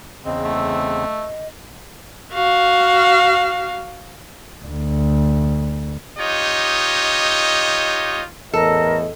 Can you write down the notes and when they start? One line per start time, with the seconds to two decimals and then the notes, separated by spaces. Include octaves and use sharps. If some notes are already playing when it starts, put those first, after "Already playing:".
0.25 E2 C#3 C4 D#5
0.44 A3
2.33 F#4 F5
4.65 D2
6.18 D#4 F4 G4 C#5 D#5
8.53 E2 A2 A4 A#4 D#5